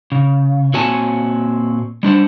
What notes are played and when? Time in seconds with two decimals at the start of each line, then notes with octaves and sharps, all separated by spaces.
0.12 C#3
0.74 A#2 C4 F#4 C#5 G#5 A5
2.03 G3 D4 C5 F#5